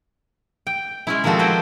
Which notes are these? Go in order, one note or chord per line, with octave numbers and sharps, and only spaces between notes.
G5
G#3 C#4 E4
D#3 F3 G#3 C4 F#4 A4
B4 C5 D#5 G5